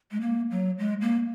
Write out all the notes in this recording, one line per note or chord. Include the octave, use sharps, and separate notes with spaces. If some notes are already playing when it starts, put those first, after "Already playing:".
G#3
A#3
F#3
G#3
A#3